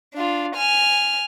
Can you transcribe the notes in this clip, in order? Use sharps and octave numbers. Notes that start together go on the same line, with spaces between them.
D4 F4
G#5 F6